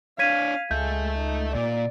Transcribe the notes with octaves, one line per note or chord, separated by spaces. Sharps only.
D4 C#5 F5 G#6 B6 D#7
C#2 G#3 A4 E5 G6
D#4
A#2 D5